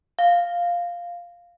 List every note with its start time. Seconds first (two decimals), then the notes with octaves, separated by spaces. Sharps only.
0.19 F5